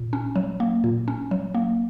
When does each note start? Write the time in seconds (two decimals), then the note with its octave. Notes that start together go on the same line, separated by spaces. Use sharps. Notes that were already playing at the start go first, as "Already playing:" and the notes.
Already playing: A#2
0.13 C#4
0.35 F#3
0.60 A#3
0.84 A#2
1.08 C#4
1.31 F#3
1.54 A#3